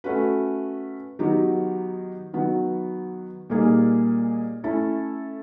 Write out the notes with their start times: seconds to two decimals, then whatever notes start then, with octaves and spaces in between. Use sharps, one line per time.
0.04 A3 C#4 F#4 B4
1.19 D#3 F#3 B3 D#4 G4
2.33 D#3 F#3 B3
3.50 A#2 G3 A#3 D#4 G#4
4.64 A3 C#4 E4 A4